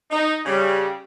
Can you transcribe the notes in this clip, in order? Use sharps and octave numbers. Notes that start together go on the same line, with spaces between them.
D#4
C#3 G3